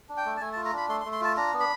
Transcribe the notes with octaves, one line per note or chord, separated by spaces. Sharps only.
D4
G5
A3
A5
A3 G#5
A5
F4
A#5
D4 B5
A3 C6
C6
A3
C6
F4 A5
D4 A#5
B3
B5